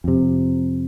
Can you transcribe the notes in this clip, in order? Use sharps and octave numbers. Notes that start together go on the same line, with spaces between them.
F2 C3